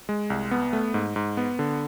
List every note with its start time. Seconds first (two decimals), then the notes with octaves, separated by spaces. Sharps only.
0.09 G#3
0.30 C2
0.51 B3
0.73 A3
0.94 G#2
1.16 G#2
1.37 B3
1.59 D3